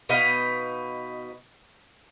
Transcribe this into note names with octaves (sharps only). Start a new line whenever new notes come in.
B2 D#4 B4 F5